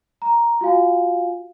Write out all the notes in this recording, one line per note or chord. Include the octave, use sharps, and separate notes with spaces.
A#5
F4 F#4 F5 G#5